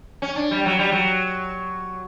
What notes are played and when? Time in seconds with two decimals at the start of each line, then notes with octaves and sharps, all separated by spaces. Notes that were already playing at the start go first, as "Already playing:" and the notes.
0.22 C#4
0.36 D4
0.51 G3
0.66 F#3
0.79 G3
0.92 F#3